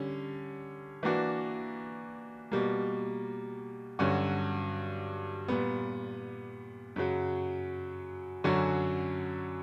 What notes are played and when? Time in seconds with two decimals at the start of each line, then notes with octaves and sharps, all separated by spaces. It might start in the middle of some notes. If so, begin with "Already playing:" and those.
Already playing: D3 G3 C#4
1.03 E3 A#3 D4 F#4
2.52 B2 G3 A#3
3.99 G2 D3 F#3 C#4 F#4
5.48 A#2 G3 B3
6.96 F#2 C#3 F#3
8.44 F#2 D3 F#3 C#4 F#4